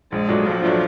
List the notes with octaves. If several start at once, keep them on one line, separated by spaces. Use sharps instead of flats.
A#1 G#3
A#2 F#3 A3 D4
A#1 F3
A#2 F#3 A3 D4